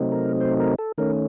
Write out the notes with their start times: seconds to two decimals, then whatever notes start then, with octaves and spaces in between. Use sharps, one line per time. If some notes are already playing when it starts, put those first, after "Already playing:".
Already playing: C3 F#3 A3 C4 D#4
0.12 A#4
0.41 C5
0.60 A#4
0.79 A4
0.98 D#3 A3 C#4 A#4